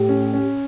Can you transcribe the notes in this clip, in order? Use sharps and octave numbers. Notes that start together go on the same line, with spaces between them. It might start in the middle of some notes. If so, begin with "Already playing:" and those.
Already playing: A2 G4
C#4
C#4